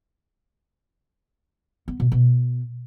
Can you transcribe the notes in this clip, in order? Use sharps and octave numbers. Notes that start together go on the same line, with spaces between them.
B3
B2
B2